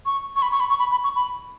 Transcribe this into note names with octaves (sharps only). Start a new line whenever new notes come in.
C#6
C#6
B5
C#6
B5
C#6
B5
B5
C#6
B5